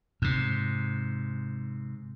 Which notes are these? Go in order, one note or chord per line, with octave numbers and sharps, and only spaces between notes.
G#2 C3